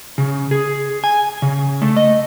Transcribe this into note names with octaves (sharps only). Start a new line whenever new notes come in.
C#3
G#4
G#5
C#3
A3
D#5